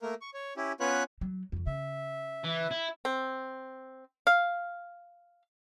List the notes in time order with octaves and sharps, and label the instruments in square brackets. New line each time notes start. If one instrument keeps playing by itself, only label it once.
[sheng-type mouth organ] A3 A#3 A#4
C#6
C#5
C#4 E4 G4
B3 C#4 F4 B4 C#5 F#6
[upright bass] F#3
F2 C#3
[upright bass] C#3 [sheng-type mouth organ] E5
[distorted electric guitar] E3
E4
[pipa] C4
F5